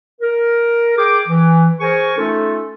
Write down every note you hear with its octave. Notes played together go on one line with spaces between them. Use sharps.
A#4
G#4 G5 D6
E3
G#4 A#4 C5 G#5 C#6
A3 C#4 D#4 F4 A4